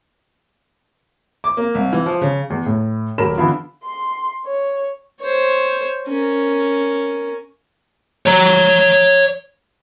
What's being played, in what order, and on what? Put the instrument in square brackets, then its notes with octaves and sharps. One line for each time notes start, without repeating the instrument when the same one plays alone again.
[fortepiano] D6
A#3
C2
E3
F3
C#3
[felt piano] E2
A2
D#1 F#3 A#4 B5 E7
D3 E3 B3 E4 F4
[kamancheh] C6
C#5
[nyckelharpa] C5 C#5
C#4 A#4
[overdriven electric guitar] C#5 A#5